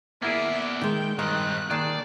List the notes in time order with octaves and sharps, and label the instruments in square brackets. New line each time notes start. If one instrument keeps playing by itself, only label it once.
[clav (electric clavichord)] A#3 E4 G#4 [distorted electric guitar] B3 D5 [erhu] E5
[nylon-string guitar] D#3 G#3 [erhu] G5
[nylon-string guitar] G2 [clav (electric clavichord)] D#3 [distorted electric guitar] G#3 C4 [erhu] F#6
[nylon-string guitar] D#2 [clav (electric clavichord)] D#3 G#4 A5 [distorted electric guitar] D5